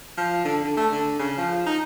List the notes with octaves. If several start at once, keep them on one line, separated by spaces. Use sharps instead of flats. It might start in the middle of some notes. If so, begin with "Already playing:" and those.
F3
D3
D3
A3
D3
C#3
F3
D#4